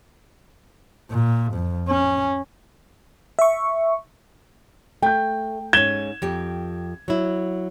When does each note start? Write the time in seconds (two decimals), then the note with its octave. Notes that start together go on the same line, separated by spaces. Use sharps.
1.11 A#2
1.53 F2
1.88 C#4
3.39 E5 C#6
5.02 A3 G5 G6
5.73 G#2 C#4 G#6 E7 G7
6.22 F2 G4
7.08 F#3 E4